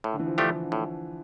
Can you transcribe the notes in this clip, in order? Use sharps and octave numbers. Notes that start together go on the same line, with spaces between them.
A2
D3
E3
F3
F3 A3 D4 G4
E3
D3
A2